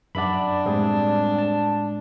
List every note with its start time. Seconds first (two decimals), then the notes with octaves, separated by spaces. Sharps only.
0.15 F#2 D4 D5 E5 F#5 B5
0.66 A2 G3 G#3 C4 G#4
1.39 A5